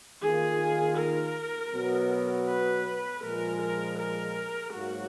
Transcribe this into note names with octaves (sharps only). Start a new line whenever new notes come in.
D#3 A#3 F4 G#4
A#4
B2 F#3 B3
B4
A#2 F3 G#3 A#4
A#4
A#4
G#2 F#3 A#3 F#4